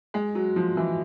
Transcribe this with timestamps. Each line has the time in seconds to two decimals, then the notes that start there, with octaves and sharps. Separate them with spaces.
0.14 G#3
0.35 F#3
0.56 F3
0.77 E3